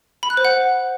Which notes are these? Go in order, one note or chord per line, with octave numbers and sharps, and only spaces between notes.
B5
F#6
C5
F#5